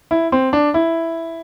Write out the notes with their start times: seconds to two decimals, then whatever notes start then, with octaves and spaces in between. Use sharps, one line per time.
0.11 E4
0.32 C4
0.53 D4
0.74 E4